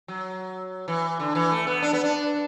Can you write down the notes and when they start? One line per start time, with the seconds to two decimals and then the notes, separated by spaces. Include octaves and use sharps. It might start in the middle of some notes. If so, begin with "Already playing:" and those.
0.08 F#3
0.88 E3
1.20 D3
1.35 E3
1.52 A3
1.67 B3
1.82 D4
1.93 B3
2.04 D4